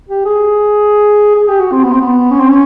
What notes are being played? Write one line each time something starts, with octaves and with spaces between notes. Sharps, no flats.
G4
G#4
G#4
G4
F#4
C4
B3
C4
B3
C#4
C4
C#4